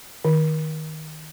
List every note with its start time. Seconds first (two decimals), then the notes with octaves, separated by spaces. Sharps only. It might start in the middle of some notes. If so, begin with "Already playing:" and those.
0.25 D#3